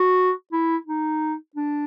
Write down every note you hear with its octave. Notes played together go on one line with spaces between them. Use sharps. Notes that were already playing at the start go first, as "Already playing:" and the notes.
Already playing: F#4
E4
D#4
D4